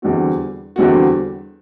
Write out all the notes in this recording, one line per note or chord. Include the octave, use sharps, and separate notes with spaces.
E2 D3 G3 C4 F#4
E2 D3 G3 C4 F#4